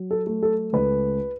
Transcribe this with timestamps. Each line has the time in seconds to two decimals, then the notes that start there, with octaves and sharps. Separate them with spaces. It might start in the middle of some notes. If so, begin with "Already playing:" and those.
Already playing: F#3
0.11 A4
0.27 A3
0.43 A4
0.73 C#2 B4